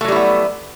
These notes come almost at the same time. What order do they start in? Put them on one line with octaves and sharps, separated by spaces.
A3 F#3 G3 E4 B3